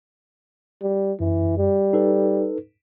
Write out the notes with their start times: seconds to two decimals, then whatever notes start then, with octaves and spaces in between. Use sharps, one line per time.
0.82 G3
1.20 F#2 E3
1.58 G3
1.93 D#4 A4 B4